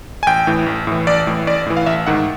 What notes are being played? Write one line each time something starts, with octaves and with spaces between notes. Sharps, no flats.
G#5
A1 G5
A2 E3
A1
A2 E3
A1 D5
A2 E3
A1 D5
A2 E3
F5
A1 E5
G#2 D#3 F#5